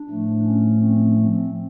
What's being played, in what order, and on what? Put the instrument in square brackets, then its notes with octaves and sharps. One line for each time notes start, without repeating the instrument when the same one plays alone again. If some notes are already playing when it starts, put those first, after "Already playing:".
Already playing: [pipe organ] D4
A2 F3 A3
C#4
C4
C4